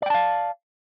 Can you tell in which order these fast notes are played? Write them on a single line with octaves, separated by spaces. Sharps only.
D5 G5 A5 F5